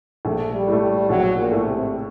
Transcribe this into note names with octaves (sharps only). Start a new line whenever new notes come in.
A#1 A3
G3
A2 A3
G3
A#1 F#3
A#2
A2 A3
C3